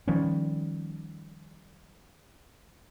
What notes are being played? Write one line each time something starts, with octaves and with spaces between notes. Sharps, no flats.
D#3 F3 G3 C#4